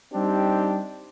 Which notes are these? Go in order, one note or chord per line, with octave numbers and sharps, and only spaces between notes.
G3 C4 D4 D#4 G4